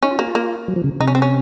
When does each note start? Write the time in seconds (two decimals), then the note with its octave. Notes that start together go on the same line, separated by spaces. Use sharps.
0.03 C#4 D#4
0.11 F4
0.18 A#3 F#4
0.27 F4
0.35 A#3
0.68 F#3
0.76 F3
0.84 C#3
1.00 C3 D#4
1.07 C#4
1.15 C4
1.22 C#4